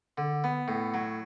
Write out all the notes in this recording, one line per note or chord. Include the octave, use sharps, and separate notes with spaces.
D3
B3
A2
F#3